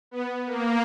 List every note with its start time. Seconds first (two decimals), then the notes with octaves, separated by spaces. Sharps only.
0.11 B3
0.46 A#3